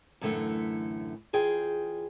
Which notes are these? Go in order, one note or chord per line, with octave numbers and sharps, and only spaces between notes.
F#2 A2 D3 E3 A3
E2 F4 G#4 G5